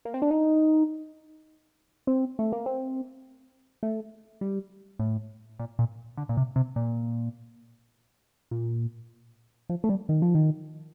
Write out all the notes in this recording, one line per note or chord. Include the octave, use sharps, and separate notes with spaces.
A#3
C4
D4
D#4
C4
A3
A#3
C4
A3
G3
A2
A#2
A#2
D3
A#2
C3
C3
A#2
A#2
F3
A3
G3
D#3
F3
D#3